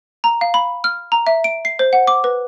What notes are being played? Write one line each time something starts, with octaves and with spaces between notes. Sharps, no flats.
A#5
F5
B5
F6
A#5
E5
D7
C7
C5
F#5
D6
B4